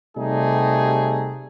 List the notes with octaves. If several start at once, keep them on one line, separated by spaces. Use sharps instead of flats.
C3 G3 A3 D#4 G#4